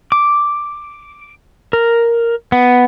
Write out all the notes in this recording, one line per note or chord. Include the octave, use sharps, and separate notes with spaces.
D6
A#4
B3